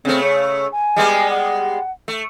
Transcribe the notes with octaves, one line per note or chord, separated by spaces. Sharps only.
C#3 A3 C4
C#5
G#5
G3 G#3 B3
F#5
A3